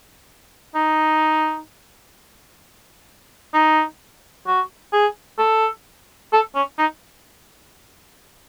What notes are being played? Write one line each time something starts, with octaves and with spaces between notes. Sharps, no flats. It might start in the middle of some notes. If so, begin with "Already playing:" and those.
D#4
D#4
F#4
G#4
A4
A4
C#4
D#4